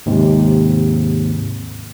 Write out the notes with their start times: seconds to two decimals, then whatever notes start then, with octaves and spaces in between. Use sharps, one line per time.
0.06 D#2 G#2 C3